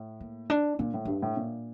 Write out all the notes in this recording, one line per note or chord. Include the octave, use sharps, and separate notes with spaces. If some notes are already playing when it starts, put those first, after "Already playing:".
Already playing: A2
A#3
D4
A#2 D4
A2
G2 D4
A2
A#2